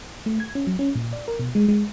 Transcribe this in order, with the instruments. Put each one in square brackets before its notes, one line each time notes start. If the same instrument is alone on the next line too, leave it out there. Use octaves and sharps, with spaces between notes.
[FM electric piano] A3
G#6
C#4
F#3
C#4
A#2
D5
A#4
B2
G#3
G#3